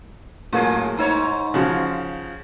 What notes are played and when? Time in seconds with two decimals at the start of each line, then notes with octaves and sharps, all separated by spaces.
0.53 A2 F#3 A#3 F4 G#4
0.97 G#2 D#4 C#5
1.54 C#3 F3 F#4